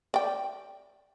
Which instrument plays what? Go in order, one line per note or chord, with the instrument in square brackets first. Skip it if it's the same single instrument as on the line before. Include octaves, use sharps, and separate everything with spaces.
[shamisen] D5 G5